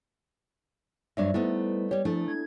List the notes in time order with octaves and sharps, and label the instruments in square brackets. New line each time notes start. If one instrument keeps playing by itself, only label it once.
[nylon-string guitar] G2 F#3 D4 [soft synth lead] G3 [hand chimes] C5 E5
[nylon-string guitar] A3 B3 D#4 [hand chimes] E4 C5
[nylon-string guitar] G3 G4 [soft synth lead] C#5
[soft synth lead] F3 [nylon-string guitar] A3 [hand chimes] D4 E4 A4
[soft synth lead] G#6